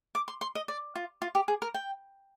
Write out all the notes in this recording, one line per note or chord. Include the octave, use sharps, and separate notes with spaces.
D6
C6
C6
D#5
D5
F4
F4
G4
G#4
A#4
G5